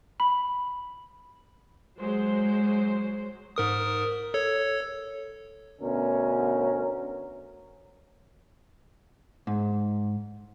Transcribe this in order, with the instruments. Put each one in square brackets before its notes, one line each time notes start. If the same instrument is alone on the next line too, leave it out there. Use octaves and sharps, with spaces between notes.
[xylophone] B5
[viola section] F#3 G#3 C5
[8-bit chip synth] G#2 A#4 D#6
A4 C#5
[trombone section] D2 B2 C#4 A#4
[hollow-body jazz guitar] G#2